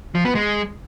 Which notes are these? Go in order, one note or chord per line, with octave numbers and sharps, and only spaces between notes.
F3
B3
G#3